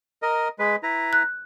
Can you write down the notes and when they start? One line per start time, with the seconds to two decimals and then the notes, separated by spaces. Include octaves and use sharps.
0.22 A#4 D#5
0.59 G#3 B4
0.83 E4 B4 A#5
1.13 F#6